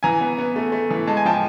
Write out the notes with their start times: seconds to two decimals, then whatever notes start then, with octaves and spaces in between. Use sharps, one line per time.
0.03 E3 G#5 A#5
0.21 B3
0.38 B3
0.56 A3
0.72 A3
0.90 E3
1.07 G#3 A5
1.17 G#5
1.25 F3 G5 A5